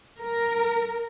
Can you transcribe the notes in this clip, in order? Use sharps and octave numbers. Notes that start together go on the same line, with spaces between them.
A#4